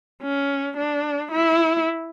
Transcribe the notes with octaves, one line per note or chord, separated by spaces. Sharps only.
C#4
D4
E4